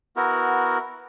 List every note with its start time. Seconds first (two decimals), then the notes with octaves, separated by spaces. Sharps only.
0.16 B3 E4 F#4 A#4